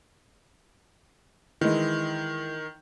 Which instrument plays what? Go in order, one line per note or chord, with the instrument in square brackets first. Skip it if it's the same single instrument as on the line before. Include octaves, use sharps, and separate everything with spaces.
[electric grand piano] D#3 [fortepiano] E3 G#3